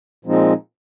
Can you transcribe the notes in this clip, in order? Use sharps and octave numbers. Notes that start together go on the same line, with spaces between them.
A#2 F3 G#3 C4 D#4